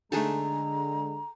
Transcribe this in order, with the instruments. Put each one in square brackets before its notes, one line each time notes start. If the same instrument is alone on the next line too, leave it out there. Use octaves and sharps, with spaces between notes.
[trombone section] D3 G#3 [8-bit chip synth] A3 D4 D#4 [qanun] G#4 A4 [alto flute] A#5